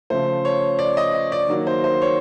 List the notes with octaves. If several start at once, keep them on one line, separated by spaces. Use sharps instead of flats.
C#3 F3 A3 C5
C#5
D5
D#5
D#5
D5
D#3 F#3 A#3
C5
C5
C#5